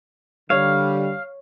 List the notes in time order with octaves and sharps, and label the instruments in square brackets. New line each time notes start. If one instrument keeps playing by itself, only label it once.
[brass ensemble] D3 G3 [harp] C#5 [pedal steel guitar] F5